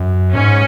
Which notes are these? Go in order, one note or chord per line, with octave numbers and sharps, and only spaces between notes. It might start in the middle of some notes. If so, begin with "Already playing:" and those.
Already playing: F#2
G#2 C#4